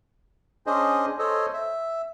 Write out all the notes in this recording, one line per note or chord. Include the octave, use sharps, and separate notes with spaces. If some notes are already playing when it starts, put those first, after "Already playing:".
C#4 D4 G#4 C5 D#5
A4 C5 C#5 D#5
E5